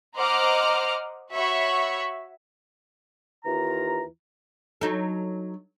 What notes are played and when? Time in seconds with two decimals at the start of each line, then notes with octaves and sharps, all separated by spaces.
0.16 C5 D#5 F#5 A#5 D6 F6
1.33 F#4 C#5 E5 B5 C#6
3.45 D#2 E3 F4 A#5
4.81 F#3 D#4 A4